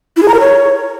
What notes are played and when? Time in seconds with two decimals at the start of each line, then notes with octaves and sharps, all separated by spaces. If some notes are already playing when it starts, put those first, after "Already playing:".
0.17 E4
0.23 G#4
0.28 A#5
0.34 A#4
0.40 C#5